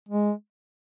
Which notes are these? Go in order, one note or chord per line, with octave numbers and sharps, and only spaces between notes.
G#3